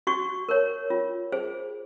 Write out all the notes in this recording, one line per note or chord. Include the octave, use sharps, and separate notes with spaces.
F#4 C#6
A#4 C#5
F4
G#4 C5